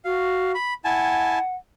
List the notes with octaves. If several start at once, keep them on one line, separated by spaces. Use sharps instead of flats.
F#4 F5
B5
E4 F#5 G#5 A5